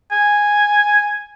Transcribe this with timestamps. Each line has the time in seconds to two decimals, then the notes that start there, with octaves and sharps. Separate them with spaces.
0.12 G#5